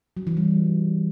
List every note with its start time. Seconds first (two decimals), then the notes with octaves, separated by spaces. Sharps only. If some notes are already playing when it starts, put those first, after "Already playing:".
0.17 F#3
0.27 E3
0.37 G3